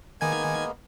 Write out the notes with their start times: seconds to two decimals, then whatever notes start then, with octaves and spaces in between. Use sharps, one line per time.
0.21 D#3 G#3 A#3 B3 G#5 G#6